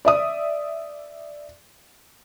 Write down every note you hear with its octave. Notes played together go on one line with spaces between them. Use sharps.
D5 E5 D#6